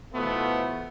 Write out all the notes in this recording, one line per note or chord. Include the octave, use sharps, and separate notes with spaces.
B2 E3 F3 A3 B3